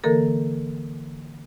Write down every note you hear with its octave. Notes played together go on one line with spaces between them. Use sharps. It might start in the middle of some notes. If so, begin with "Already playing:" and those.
D3 E3 A#3 A4 A#4